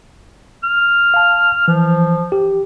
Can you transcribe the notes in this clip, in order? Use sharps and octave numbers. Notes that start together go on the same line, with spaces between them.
F6
F5 A5
E3 F3
G4